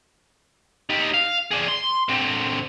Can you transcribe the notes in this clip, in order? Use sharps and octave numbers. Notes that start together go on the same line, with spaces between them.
D#4 G4
F5
D4 G#4
C6
D3 C4